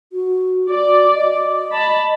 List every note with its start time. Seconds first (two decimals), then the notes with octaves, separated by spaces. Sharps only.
0.13 F#4
0.70 F#4 D5
1.14 D#5
1.72 A5 B5